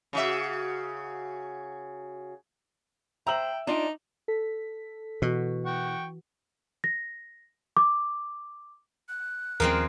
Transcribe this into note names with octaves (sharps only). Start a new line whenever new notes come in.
C#3 F#4 E5
C5 E5 G5 A#5 E6 F#7
D4 D#4 F4 G5
A4 B6
B2 E3 F#4
F#5 G5 C#6
A#6
D6
F#6
D#2 F3 G#3 C4 C#4 A#4